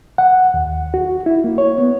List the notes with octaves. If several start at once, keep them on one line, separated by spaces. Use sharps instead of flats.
F#5
D#2
F#4
E4
A#3
C#5
B3